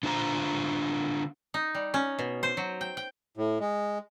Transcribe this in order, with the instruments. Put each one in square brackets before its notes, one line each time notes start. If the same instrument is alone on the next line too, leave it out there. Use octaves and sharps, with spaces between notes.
[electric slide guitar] D3 D4 F4 C5 A5 A#5
[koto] D#4
G3
C#4
B2
C5
F#3
G5
G5
[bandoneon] A2
G#3